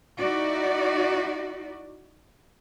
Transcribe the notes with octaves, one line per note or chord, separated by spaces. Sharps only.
D#4 E4 F#4 D5